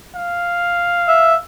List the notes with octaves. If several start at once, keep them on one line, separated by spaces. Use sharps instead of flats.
F5
E5